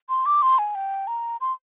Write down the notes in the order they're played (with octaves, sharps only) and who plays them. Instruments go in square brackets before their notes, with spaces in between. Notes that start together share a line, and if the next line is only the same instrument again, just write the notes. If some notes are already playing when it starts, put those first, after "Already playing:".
[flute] C6
D6
C6
G#5
G5
A#5
C6